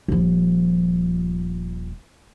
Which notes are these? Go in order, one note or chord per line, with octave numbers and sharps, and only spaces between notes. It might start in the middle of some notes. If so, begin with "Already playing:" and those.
D#1 F3